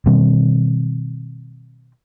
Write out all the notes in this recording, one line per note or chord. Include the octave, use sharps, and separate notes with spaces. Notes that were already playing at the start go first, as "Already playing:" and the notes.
B2 D#3 G3 C4